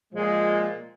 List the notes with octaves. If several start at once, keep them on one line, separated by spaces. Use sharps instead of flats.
A#2 F3 G#3